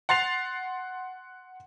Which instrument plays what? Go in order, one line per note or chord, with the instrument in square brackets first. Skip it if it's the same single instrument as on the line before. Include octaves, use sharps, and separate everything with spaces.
[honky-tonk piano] F#5 C6 A6 C7 F7